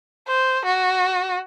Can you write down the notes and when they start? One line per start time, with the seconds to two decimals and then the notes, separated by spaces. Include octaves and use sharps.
0.28 C5
0.65 F#4